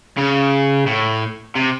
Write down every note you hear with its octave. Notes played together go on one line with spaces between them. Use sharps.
C#3
A2
C3